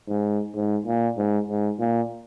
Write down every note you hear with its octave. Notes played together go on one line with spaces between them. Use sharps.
G#2
G#2
A#2
G#2
G#2
A#2